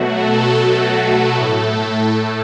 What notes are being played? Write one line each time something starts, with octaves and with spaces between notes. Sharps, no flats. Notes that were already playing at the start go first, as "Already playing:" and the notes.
Already playing: B2 F#3 A3 F#4
A4
A4
F#4
A2 A3 A4